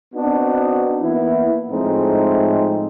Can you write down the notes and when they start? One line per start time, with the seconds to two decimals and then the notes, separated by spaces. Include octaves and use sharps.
0.14 B3 C4 D4 D#4 F#4
1.01 E3 A#3 B3 E4
1.69 A2 F3 G#3 A3 C4 D#4